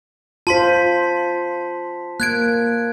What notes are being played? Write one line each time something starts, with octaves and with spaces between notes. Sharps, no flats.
F4 C5 A5 C6 B6
A#3 F#6 G#6 D7